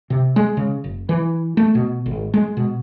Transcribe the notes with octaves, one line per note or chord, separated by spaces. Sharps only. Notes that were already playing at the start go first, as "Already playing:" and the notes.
C3
G#3
C#3
F#1
E3
A3
B2
G#1
G#3
B2